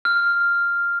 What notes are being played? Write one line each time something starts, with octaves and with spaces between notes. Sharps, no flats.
F6